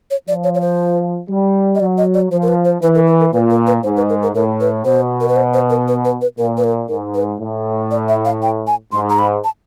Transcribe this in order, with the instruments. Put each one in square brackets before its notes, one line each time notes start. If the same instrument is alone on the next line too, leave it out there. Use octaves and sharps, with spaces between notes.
[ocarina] C#5
[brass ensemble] F3 [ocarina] D5
[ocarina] C#5
C#5
C5
[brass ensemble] G3
[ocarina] D#5
[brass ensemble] F#3 [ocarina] D5
[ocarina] D#5
D5
[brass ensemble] F3 [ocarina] C5
[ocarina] A#4
B4
C5
[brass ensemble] E3 [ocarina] B4
[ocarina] A#4
B4
A#4
[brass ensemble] A#2 [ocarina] B4
[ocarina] A#4
B4
[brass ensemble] G#2 [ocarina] C5
[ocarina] B4
A#4
A#4
[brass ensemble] A2 [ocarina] A#4
[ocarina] B4
[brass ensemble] B2 [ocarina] C5
[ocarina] A#4
B4
C5
C5
A#4
B4
B4
B4
[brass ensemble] A#2 [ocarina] A#4
[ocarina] B4
A#4
[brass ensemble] G#2 [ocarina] A#4
[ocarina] B4
[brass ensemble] A2
[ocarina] D5
E5
F5
G5
G#5
[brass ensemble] G#2 [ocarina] C6
[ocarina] A#5
B5
A5